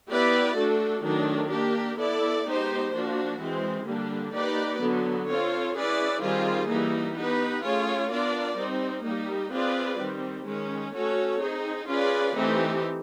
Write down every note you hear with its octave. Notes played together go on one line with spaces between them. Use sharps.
B3 E4 G4 B4 D5
A3 D4 F#4 A4
D#3 F#3 A3 D4
A#3 D4 G4 A#4
B3 E4 A4 D5
G#3 B3 D#4 G4 C5
F3 A#3 D4 F#4
E3 G#3 C4
D3 G3 A#3 D4
A#3 D#4 G4 B4 D5
D3 F#3 B3
C4 F4 A4 C#5
C#4 E4 G#4 B4 D5
D#3 G3 C4 F4 G#4
E3 G3 A#3 D#4
B3 D#4 G4 B4
A3 C#4 F4 G#4 C#5
B3 D4 F4 A#4 D5
G3 C4 D#4
G3 A#3 D#4 G4
C4 F4 G#4 B4 D5
D#3 G3 C4
D#3 G#3 C#4
A3 C#4 F#4 A4 C#5
C4 D#4 G#4
C#4 F4 G#4 B4 D5
E3 A3 C4 D#4 G4